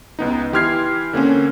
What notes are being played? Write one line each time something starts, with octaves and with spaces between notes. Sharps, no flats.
C#2 B3 D#4
E3 G4 C6 F6 G#6 C7
D3 A#3 C4 C#4